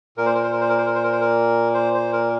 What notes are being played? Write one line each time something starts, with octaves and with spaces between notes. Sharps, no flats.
A#2 A#4
C5
A#4
C5
A#4
C5
A#4
C5
A#4
C5
A#4
C5
A#4
C5
C5
A#4